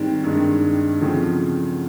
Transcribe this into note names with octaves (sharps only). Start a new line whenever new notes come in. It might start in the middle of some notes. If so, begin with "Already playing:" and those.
Already playing: G#2 D#3 G3 C4
G2 D#3 G#3
E2 C#3 F3 A3 C4